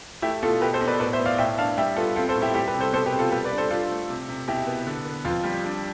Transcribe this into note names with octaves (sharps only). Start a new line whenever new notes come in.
A3 E4 G4
B2 F4 A4
B2 G4 B4
A4 C5
B2
B4 D5
A2 B4 D5
C5 E5
B3
D5 F5
A2 E5 G5
D4 F5 A5
G3 E5 G5
B3 F4 A4
C4 F4 A4
A4 C5
A2
E4 G4
G3 E4 G4
G4 B4
C3
A4 C5
B2 A4 C5
G4 B4
C4
F4 A4
G3 G4 B4
B4 D5
D4
A4 C5
D4 F4 A4
A3
C3
C3
B2 E4 G4
B3
D3
B3
F2 F4
G3
D4